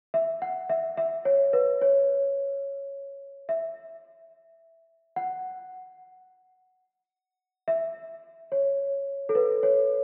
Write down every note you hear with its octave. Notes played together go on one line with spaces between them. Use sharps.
E5
F#5
E5
E5
C#5
B4
C#5
E5
F#5
E5
C#5
A4
B4
C#5